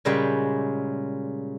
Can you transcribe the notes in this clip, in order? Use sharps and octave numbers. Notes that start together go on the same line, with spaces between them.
A#2 C#3 G3 G#3 G5 B5